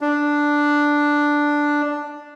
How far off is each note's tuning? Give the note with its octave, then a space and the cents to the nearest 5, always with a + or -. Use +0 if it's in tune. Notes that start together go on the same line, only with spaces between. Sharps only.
D4 +0